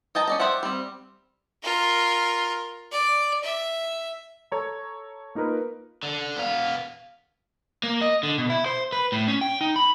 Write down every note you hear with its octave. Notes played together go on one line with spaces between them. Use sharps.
D#5 G5 A5 A#5
C#4 D5 D#5
G4 C5 D5 E5 F#5
G3 C4
F4 A#4
D5
E5
A4 C#5 A#5
A#3 D#4 F4 A#4 B4
D3
B3 F5
A#3
D#5
D3
B2
E4
C5
B4
A2
C#4
G5
D#4
B5